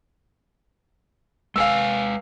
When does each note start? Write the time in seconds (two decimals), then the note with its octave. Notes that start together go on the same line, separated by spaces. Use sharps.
1.56 G#3 B4 F5 G#5 E6